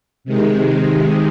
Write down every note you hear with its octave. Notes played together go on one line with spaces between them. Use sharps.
C3 D#3 G#3